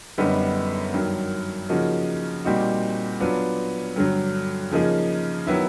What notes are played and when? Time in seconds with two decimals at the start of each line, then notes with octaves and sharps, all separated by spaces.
0.18 F#2 D3 G3 B3 D#4
0.93 G2 D#3 F#3
1.69 C#3 F3 A#3 D#4 F#4
2.45 A#2 G3 C4 D#4 F#4
3.20 F#3 B3 D4 F4
3.96 G2 D3 F#3
4.71 C#3 F3 A#3 D#4 G#4
5.47 D#3 F#3 B3 E4